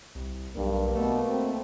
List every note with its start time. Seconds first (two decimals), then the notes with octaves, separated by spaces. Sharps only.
0.15 C2
0.56 B1 G2 A#3
0.95 B2 A3
1.29 C4